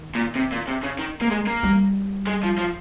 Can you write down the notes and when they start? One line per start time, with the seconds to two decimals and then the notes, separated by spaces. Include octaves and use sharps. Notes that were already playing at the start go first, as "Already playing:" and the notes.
Already playing: D#3
0.15 A#2
0.35 C3
0.52 A#2
0.68 C3
0.83 C#3
0.99 D#3
1.22 A#3
1.31 G#3
1.47 A#3
1.63 G3
2.27 G#3
2.43 F3
2.58 F3